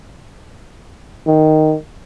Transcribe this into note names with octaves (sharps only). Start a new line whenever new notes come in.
D#3